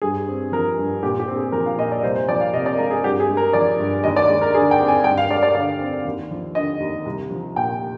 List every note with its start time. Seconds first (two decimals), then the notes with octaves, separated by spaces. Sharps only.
0.02 G2 G#4
0.28 C4
0.52 F3 A#4
0.78 G2
1.03 A#2 G4
1.20 G4
1.28 C4
1.37 G#4
1.52 F3 A#4
1.66 F5
1.78 A#2 D#5
1.92 D5
2.03 C2 C5
2.15 C5
2.28 F3 D5
2.41 F5
2.53 C3 D#5
2.66 D5
2.79 G#3 A#4
2.91 G#4
3.03 G2 G4
3.20 G#4
3.29 G#3
3.37 A#4
3.53 F3 D5
3.80 G2
4.04 D#2 D#5
4.16 D5
4.30 G#3
4.41 A#4
4.54 D3 G#4
4.71 G5
4.80 C4
4.88 G#5
5.04 G2 G5
5.18 F5
5.29 G#3 D5
5.43 D5
5.55 D3 D5
5.80 C4
6.05 D#2
6.31 F3
6.55 D3 D#5
6.80 D#2
7.06 C2
7.30 F3
7.56 A#2 G5